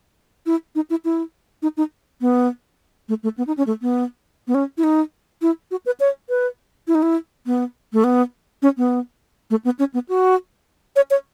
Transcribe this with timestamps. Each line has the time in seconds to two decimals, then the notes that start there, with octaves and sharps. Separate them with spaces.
0.46 E4
0.75 D#4
0.90 E4
1.05 E4
1.62 D#4
1.77 D#4
2.21 B3
3.09 A3
3.23 A3
3.38 B3
3.47 D#4
3.57 C#4
3.67 A3
3.82 B3
4.48 B3
4.54 C#4
4.78 E4
4.84 D#4
5.42 E4
5.71 F#4
5.86 B4
6.00 C#5
6.29 B4
6.88 E4
6.95 D#4
7.03 E4
7.46 B3
7.93 A3
8.04 B3
8.62 C#4
8.77 B3
9.50 A3
9.65 B3
9.79 C#4
9.94 B3
10.09 F#4
10.96 C#5
11.11 C#5